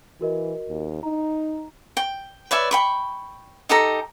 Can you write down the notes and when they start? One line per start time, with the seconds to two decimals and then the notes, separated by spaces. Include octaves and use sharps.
0.21 E3 F#4 A#4 D#5
0.68 D#2
1.03 D#4 A#5
1.97 G5
2.51 B4 C#5 D5 E5
2.71 G5 B5 C#6
3.69 D#4 G4 A4 A#5